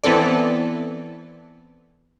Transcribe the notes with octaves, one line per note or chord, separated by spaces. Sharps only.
E3 B3 C4 A4 D5